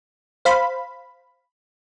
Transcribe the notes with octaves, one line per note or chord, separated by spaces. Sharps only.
C5 F5 B5